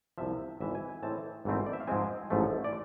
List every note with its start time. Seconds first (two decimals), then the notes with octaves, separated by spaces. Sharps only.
0.18 C2 C3 F3 E5
0.60 G#1 G#2 E3 E5
0.75 G#5
0.89 G#5
1.03 A2 E3 G#3 C4 A5
1.45 G#1 G#2 E3 A3 C4
1.66 D5
1.73 E5
1.80 F5
1.87 G#2 F3 G#3 C4 G#5
2.30 A1 G#2 F3 A3
2.64 D5